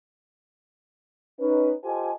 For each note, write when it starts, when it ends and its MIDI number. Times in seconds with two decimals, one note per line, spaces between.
1.40 1.72 61
1.40 1.72 63
1.40 1.72 71
1.84 2.12 65
1.84 2.12 67
1.84 2.12 69
1.84 2.12 72
1.84 2.12 75
1.84 2.12 80